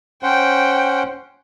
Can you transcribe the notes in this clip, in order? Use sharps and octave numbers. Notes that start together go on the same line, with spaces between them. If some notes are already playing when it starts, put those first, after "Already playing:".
C#4 C5 F#5 G5